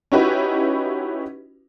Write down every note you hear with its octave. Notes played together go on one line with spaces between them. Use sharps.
C#4 D#4 E4 F#4 G4 B4